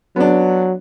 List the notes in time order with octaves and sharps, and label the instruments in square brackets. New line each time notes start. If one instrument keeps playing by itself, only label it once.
[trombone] F#3 [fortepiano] B3 D4